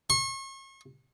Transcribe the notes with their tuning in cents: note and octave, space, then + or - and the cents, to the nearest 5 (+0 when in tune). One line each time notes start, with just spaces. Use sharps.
C#6 -40